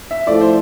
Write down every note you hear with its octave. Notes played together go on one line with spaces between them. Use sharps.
E5
A2 F3 D5
C5